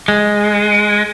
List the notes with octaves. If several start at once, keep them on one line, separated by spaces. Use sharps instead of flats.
G#3